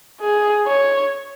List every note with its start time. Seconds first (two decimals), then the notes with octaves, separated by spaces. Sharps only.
0.21 G#4
0.67 C#5